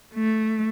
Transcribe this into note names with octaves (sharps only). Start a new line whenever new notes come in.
A3